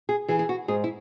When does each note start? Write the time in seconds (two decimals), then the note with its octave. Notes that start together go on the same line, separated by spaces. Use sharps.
0.09 G#4
0.28 E3 G#4
0.39 G#4
0.49 F#4
0.68 G#2 G#4
0.84 E4